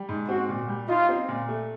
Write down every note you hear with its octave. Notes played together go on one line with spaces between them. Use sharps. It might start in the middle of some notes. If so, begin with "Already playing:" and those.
Already playing: G3
G#2
C4 F#4
A#2
G3
D#4 F4
C4
A#2
A3